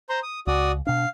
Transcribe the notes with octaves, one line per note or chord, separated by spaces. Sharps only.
C5 A#5 C6
D#6
C#2 F#4 D5 D#6
B2 D4 F5